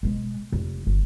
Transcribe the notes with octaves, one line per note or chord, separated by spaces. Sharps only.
B2 G#3
F1
G1